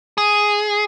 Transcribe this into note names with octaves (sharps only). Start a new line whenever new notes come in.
G#4